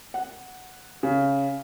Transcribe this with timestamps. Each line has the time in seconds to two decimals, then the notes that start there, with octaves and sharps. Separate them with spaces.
0.14 F#5
1.03 C#3